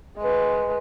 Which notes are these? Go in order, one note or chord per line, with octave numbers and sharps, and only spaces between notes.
G#3 B4